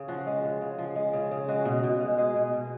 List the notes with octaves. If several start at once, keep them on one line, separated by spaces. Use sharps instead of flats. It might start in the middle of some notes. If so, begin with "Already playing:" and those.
Already playing: C#3
F3 F#4
G#3
C#3
C#3
F3
G#3
C#3
C#3
G#3 F#4
B2
B2
G#3
G#3 G#4
B2
B2